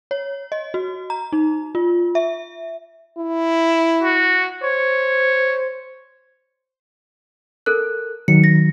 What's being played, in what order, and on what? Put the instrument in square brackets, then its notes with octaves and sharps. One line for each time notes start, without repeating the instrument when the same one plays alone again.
[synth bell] C#5
D#5
F#4
A#5
D#4
F4
E5
[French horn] E4
[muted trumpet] F#4
[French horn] C5 [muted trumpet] C#5
[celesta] A4 A#4 F#6
[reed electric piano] D#3 F#3 [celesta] C#7
[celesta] A#6